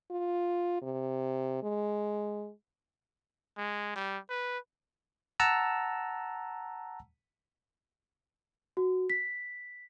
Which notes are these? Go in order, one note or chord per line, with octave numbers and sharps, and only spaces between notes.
F4
C3
G#3
G#3
G3
B4
F#5 A5 A#5 E6
F#4
B6